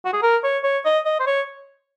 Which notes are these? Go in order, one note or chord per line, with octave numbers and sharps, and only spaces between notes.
F#4
G#4
A#4
C#5
C#5
D#5
D#5
C5
C#5